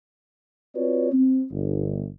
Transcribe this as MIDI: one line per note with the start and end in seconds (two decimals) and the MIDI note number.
0.76 1.11 60
0.76 1.11 65
0.76 1.11 66
0.76 1.11 71
0.76 1.11 73
0.76 1.11 74
1.12 1.44 60
1.51 2.07 31